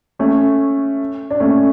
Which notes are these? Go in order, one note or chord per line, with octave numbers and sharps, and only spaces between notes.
A3 C#4
D4
A3 C#4